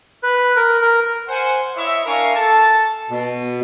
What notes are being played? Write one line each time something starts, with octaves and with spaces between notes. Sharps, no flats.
B4
A#4
A#4
C5 F#5 G#5
E4 C#5 D#5 E5
D4 A#4 E5 F5 G#5 C#6
A4 A5
B2